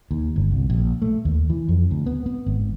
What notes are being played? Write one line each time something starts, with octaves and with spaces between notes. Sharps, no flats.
D#2
G1
C2
A#1
A3
D#2
E3
F2
D2
B3
B3
G#1